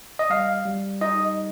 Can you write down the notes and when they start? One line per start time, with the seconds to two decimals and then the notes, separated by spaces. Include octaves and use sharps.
0.19 D#5
0.30 G3 F5
0.66 G3
1.01 D#4 D#5